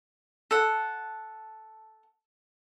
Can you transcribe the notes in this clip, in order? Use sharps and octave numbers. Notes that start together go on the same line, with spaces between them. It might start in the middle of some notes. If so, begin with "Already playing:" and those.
A4 F#5